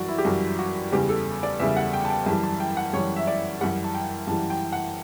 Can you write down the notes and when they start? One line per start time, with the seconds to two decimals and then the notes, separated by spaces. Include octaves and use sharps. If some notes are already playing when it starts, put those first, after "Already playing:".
Already playing: F#2 E3 G3 F#4 D5
0.08 E4
0.18 G4
0.25 F#2 E3 G3 F#4
0.59 F#4
0.92 E2 C#3 G3 G4
1.09 A4
1.43 D5
1.59 E2 C#3 G3 E5
1.76 F#5
1.93 G5
2.05 A5
2.10 G5
2.26 F#2 E3 G3 A5
2.43 A5
2.60 G5
2.77 F#5
2.93 F#2 E3 G3 C#5
3.16 E5
3.27 D5
3.61 F#2 E3 G3 F#5
3.84 A5
3.94 G5
4.27 F#2 E3 G3 A5
4.50 G5
4.72 F#5